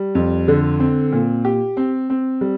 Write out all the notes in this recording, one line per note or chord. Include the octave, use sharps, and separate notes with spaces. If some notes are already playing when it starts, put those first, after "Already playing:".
Already playing: G3
F2
D3
C4
A#2
G4
C4
C4
G3